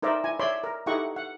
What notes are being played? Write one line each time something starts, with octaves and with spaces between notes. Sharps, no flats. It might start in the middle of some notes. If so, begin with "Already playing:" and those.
D#4 A#4 C5 D5 E5
E4 G#5
C#5 D5 E5 B5 C6
A#4
D#4 E4 G4 A4 F#5 C#6
F#5